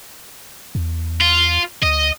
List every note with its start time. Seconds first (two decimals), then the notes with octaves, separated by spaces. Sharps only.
0.75 E2
1.21 F4
1.82 D2 D#5